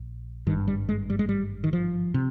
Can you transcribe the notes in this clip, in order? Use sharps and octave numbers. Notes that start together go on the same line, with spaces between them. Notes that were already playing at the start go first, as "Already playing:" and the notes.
Already playing: A#1
G#1 G2 D#3
G3
G#3
G3
G#3
G3
D#3
F3
C3